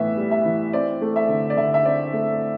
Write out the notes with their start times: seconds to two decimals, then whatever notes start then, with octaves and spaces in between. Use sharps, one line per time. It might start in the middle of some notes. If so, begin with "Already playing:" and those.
Already playing: A2 E3 B3 E5
0.17 G3
0.31 E5
0.45 E3
0.73 C4 D5
1.01 A3
1.16 E5
1.29 D3
1.50 D5
1.57 D3 E5
1.74 E5
1.85 C4 D5
2.13 A3